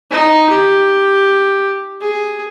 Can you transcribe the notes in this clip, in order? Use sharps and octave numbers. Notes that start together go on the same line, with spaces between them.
D#4
G4
G#4